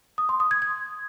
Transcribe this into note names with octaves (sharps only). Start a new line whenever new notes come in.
D#6
C6
D#6
G#6
G#6